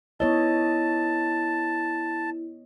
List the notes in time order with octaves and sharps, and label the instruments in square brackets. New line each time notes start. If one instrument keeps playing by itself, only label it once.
[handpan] B3 C#5 D#5 [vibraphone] E4 [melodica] A5